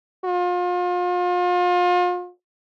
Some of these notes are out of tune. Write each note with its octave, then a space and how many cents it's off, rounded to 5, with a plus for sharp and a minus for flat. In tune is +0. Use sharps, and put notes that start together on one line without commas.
F4 +35